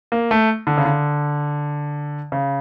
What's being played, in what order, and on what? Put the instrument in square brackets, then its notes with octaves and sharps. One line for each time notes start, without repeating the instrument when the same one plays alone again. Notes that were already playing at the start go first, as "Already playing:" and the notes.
[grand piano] A#3
A3
D3
C#3
D3
C#3